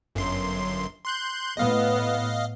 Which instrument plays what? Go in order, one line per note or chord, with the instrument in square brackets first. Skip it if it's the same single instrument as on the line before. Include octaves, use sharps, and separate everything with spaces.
[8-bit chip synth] G1 F#2 C6
C6 F#6 G6
[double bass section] A2 B3 [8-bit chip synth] D#5 F5